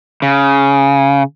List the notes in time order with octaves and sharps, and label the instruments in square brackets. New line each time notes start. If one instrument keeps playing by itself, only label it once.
[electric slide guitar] C#3